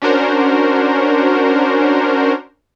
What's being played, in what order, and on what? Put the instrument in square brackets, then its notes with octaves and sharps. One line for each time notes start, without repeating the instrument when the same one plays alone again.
[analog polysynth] C#4 D4 F#4 A#4 C5